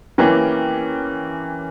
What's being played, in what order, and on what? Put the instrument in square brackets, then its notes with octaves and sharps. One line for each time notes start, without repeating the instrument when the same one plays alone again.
[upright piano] E3 A#3 C#4 G4 A#4